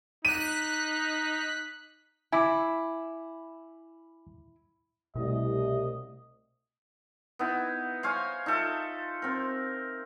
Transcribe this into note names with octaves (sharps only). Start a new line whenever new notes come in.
D#4 F#6 B6 D#7
E4 G#5 B5 D6
C2 B2 A3 D#5
B3 D#4 E4
C5 C#5 F5 G#5
D#4 F4 A4 E5
C4 A#4